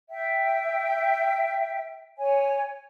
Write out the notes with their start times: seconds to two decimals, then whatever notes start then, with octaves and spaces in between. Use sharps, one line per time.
0.10 E5 G5
2.18 C#5 G#5